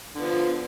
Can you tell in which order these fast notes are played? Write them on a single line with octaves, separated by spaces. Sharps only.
D3 B3 F3